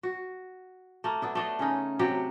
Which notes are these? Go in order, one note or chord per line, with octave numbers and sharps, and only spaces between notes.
F#4
A3 A#3
B3 D4 E4
A3 D4 D#5
C#3 C#4 D#4
C3 F#3 F#4 G4